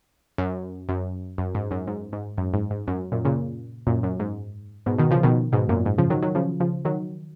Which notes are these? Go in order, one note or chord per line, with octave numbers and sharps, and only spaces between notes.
F#2
F#2
F#2
G#2
F#2
G#2
G#2
F#2
G#2
G#2
F#2
F#2 A#2
A#2 C#3
F#2 A#2
F#2
G#2
G#2 B2
B2 D#3
C#3 F3
B2 D#3
G#2 B2
F#2 A#2
G#2
C#3 F3
D#3 F#3
D#3 F#3
C#3 F3
C#3 F3
D#3 F#3